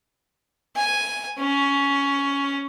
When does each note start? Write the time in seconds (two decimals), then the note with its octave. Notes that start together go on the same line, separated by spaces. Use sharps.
0.76 G#5
1.38 C#4